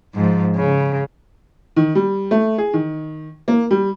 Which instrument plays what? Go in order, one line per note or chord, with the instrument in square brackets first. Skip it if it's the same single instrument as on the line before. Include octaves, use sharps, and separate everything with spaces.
[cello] G#2 F3
C#3
[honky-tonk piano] D#3
G3
A3
G#4
D#3
A#3
G3